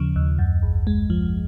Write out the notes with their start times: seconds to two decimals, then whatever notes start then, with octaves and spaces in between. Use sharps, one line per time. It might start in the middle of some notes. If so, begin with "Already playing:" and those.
Already playing: D#2 C#3 F3
0.16 D#2
0.39 F#2
0.63 G#1
0.87 G#3
1.10 F3